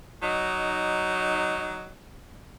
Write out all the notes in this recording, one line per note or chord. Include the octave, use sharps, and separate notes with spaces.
F#3 D#4